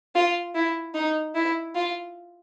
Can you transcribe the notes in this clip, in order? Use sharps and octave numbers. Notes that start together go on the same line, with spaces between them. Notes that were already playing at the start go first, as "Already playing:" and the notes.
F4
E4
D#4
E4
F4